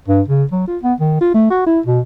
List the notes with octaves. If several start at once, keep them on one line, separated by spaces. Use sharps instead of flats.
G2
C#3
F#3
F4
B3
D#3
F4
A3
F#4
E4
B2